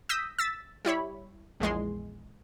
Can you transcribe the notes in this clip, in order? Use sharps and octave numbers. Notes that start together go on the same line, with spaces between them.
D#6 E6 G6 A#6 B6
E6 A6 B6
G3 E4 C#5 B5
A#1 E2 G#3 C6